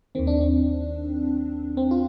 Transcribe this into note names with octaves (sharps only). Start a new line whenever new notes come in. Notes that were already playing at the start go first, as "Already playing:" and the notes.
D#2 D#3 C4
D4
C4
C4
F4